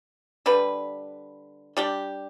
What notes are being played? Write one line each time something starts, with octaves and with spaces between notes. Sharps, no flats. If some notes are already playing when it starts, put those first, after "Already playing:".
D3 G3 D4 B4
G3 D4 G4